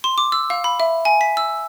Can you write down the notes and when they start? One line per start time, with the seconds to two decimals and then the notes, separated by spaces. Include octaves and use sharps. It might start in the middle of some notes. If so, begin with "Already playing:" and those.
0.04 C6
0.18 D6
0.32 E6
0.50 F5
0.64 B5
0.80 E5
1.05 G#5
1.21 B6
1.37 E6